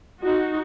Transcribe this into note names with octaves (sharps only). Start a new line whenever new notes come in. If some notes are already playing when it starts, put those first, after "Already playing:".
D#4 F#4